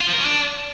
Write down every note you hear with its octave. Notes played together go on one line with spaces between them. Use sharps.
F4
F3
A#4
C#4
D4